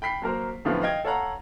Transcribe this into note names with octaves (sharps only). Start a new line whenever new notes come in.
G5 B5 B6 C7
F#3 A#3 A#4 C5
F#2 A2 D3 F3 B3 F4
D#5 F5 G5 G#6
A4 C#5 F5 F#5 A#5